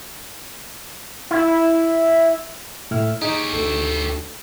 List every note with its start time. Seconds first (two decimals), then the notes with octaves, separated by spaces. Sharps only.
1.31 E4
2.91 A2 E4 F6
3.22 D#4 G4 G#4 C#5
3.53 D2 A4